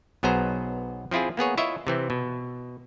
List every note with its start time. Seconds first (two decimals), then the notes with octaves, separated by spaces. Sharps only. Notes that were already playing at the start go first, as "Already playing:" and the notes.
0.23 B1 F#3 B3 G#4 C5 A#5
1.11 F3 C4 E4 F4 G#4
1.37 A#3 B3 G#4 C#5
1.58 E4 F4 C#5 D#5 E5
1.87 C3 E3 C4
2.10 B2